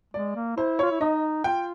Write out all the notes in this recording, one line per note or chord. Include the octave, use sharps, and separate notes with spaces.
G#3 D5
A#3
E4 C5
F4 C#5
E4
D#4 D#5
F4 G5